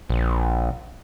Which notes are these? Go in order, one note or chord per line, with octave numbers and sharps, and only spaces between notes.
A#1